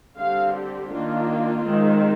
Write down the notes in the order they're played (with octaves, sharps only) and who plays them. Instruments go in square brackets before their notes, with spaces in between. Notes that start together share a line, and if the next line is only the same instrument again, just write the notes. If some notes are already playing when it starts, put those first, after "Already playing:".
[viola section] D3 G3 C4 F5
G4
D#3 A#3 D4 F4
D#3 G#3 C4